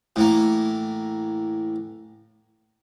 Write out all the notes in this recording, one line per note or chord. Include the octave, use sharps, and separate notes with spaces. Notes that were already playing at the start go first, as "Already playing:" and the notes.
A2 E3 A#3